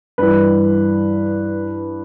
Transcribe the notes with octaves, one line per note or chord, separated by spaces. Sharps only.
G2 E3 B4